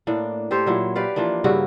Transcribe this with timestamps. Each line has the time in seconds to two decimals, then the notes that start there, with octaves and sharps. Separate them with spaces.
0.07 A2 A#3 D4
0.51 G4 A4 C5 C#5
0.66 A#2 F#3 E4
0.95 G4 B4 D5 F5
1.16 E3 F3 A#3 D4
1.44 G2 C#3 E4 F#4